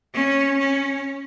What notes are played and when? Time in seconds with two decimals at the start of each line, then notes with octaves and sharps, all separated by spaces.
0.14 C#4
0.57 C#4